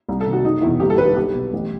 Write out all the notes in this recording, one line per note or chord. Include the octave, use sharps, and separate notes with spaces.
C2
A4
C3 D#3
F#4
F#1 D#4
E2 B2 E4
G1 G4
A4
G2 D#3 B4
B1 G4
B2
A1